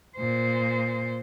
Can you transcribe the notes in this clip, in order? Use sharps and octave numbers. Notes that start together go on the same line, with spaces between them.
A#2 C5